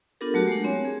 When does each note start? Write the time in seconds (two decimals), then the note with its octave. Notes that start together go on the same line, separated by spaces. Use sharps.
0.21 B3 D4 F4 G4 A4 A#4
0.34 F#3 A3 F#4 G4
0.47 G#3 D4
0.64 C4 C#5 G#5
0.85 G#4